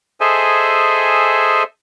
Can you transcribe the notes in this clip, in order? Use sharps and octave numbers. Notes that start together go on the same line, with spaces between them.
G#4 A4 C5 D#5 E5 G#5